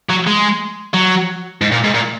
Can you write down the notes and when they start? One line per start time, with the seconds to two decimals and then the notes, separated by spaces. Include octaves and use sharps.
0.10 F#3
0.27 G#3
0.94 F#3
1.62 G#2
1.72 A#2
1.84 G#2
1.94 A#2